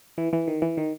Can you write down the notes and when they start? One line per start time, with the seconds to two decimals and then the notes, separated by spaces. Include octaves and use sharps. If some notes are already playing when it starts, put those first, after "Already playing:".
0.18 E3
0.33 E3
0.48 D#3
0.62 E3
0.77 D#3